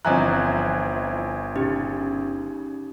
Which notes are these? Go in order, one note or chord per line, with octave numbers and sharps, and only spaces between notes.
G1 E3 F3 C4 D#5 G#5 A#5 F#6
C#3 D#4 G4